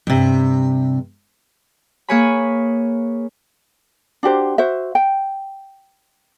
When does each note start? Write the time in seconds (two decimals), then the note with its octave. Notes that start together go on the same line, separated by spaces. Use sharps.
0.07 G2 C3
2.08 A#3 G#4 B4 C#5 G#5 B5
4.23 D4 F#4 G4 C5
4.58 F#4 C5 E5
4.95 G5